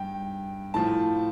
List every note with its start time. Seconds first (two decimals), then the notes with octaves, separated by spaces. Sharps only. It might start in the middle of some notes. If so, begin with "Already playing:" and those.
Already playing: G2 G5
0.74 A2 F3 A5